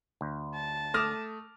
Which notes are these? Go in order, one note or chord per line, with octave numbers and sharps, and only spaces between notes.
D2
A5
A3 D6 D#6 F6 A#6